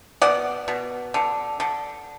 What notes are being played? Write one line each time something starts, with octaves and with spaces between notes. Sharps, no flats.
B2 D5 F#5
B2
D3
D3